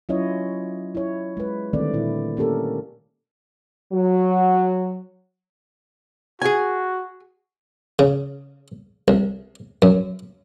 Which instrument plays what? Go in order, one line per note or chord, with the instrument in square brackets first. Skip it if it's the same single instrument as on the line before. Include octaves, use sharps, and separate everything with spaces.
[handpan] F#3 C#4 E4 F4 C#5 D#5
E4 C#5
G#3 B4
D3 D#3 G3 A3 C4 D5
A#2 E4
A#3 C#4 G4 A4 A#4
[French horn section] F#3
[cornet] F#4 [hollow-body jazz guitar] G#4 G#5
[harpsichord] C#3
C2
F#2